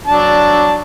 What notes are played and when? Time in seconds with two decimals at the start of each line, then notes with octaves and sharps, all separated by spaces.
0.08 F#3 D4 A5